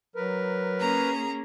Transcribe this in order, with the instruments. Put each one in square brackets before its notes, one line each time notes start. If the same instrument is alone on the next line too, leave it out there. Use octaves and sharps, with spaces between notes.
[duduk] F#3 [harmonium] A#4 B4
[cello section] A#3 C#4 G#4 [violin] A#5